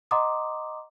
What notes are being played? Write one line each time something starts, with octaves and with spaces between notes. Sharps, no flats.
D#5 F#5 A#5 C6 D6 D#6